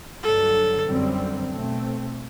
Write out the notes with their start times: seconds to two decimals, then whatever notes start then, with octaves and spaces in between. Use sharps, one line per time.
0.23 G2 D3 F#3 A4
0.87 F#2 D3 G3 C4
1.51 B2 A3 C4